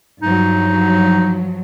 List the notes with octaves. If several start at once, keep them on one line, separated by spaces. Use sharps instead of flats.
G2 F3 F#3 D#4